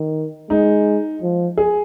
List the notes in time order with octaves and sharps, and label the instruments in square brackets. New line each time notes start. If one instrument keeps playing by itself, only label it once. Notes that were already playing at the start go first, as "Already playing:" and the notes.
Already playing: [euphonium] D#3
[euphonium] G#3 [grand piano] D#4
[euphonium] F3
[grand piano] G#4